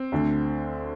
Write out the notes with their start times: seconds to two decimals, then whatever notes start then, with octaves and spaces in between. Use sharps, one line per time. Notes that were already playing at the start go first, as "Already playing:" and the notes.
Already playing: C4
0.12 D2 D3